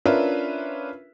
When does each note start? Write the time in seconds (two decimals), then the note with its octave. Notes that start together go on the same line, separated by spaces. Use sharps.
0.05 C#4 D4 F4 A#4 B4 E5